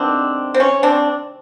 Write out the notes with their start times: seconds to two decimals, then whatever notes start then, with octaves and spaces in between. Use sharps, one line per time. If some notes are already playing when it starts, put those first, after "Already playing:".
Already playing: C3 D#3 G#3 B3 C4 D4
0.54 C4
0.60 C#4
0.83 C4 D4